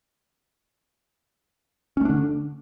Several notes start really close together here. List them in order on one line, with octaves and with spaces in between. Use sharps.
C#4 A3 D4 D3